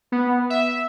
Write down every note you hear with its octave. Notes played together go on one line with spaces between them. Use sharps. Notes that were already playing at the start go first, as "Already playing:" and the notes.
B3
E5